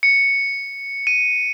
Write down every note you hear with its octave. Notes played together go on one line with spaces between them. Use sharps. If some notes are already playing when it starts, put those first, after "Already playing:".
C#7
D#7